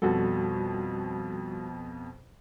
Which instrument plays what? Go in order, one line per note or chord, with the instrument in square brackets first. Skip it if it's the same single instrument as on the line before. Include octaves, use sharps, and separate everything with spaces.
[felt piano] F2 B2 A4 [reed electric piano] G3 F#4